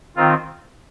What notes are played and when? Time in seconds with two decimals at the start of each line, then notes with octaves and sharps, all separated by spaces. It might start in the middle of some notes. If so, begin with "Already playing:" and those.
0.16 D#3 C4 F4